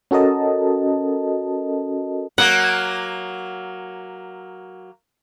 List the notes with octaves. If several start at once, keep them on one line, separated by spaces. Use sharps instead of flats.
C#4 F#4 A4 A#4 D#5 A5
F#3 A#3 F#5